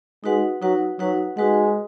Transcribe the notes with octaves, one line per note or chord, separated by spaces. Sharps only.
G#3 D#4 F#4 B4 F#5
F#3 D#4 F#4 B4 F#5
F#3 D#4 F#4 B4 F#5
G#3 D#4 F#4 B4 F#5